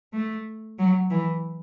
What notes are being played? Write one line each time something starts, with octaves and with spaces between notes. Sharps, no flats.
A3
F#3
E3